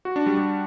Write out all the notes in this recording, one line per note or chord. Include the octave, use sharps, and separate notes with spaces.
F#4
D4
G3
G3